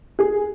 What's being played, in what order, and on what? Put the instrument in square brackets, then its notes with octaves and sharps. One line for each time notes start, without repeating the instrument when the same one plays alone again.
[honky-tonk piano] G#4